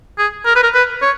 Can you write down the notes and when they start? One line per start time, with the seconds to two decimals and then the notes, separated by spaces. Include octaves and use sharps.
0.18 G#4
0.45 A#4
0.55 B4
0.63 A#4
0.74 B4
1.02 C#5